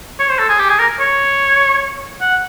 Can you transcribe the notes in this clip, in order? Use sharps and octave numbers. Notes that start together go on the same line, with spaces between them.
C#5
C5
A4
G#4
G4
G#4
A#4
C#5
F#5